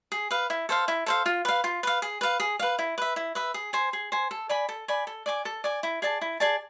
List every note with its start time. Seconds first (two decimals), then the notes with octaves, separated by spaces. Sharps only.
0.12 G#4
0.31 B4 F5
0.50 E4
0.69 A4 C5 F5
0.88 E4
1.06 A4 C5 F5
1.26 F4
1.45 B4 F5
1.64 F4
1.83 B4 F5
2.02 G#4
2.21 B4 F5
2.40 G#4
2.59 B4 F5
2.79 E4
2.98 B4 E5
3.16 E4
3.35 B4 E5
3.54 G#4
3.73 C5 G#5
3.93 G#4
4.12 C5 G#5
4.31 A4
4.49 D5 G#5 B5
4.69 A4
4.88 D5 G#5 B5
5.07 A4
5.26 D5 G#5 D6
5.45 A4
5.64 D5 G#5 D6
5.83 E4
6.02 G#4 D5 A5
6.21 E4
6.40 G#4 D5 A5